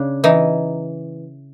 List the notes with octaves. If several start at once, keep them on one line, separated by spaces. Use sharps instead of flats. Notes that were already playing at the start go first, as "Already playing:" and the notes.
Already playing: C#3 D4
E3 D#4